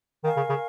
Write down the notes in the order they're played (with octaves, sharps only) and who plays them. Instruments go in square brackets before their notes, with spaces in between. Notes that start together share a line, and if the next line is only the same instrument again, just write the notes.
[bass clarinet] D#3 [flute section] A#4 F5 G#5 C#6
[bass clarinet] C#3
C#3